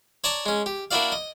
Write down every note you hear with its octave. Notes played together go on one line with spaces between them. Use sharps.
C#5 D5 A5 A#5 C#6 D6
G#3 C#4
G4
A#3 D4 E4 F#4 D5 F5
D#5